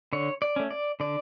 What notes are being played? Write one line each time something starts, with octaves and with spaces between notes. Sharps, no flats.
D3 C#5
D5
A3 C#4
D5
D3 D5